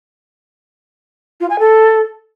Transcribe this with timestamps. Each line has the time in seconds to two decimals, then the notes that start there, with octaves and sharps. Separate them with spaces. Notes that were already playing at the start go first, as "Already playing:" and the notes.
1.40 F4
1.50 G#5
1.59 A4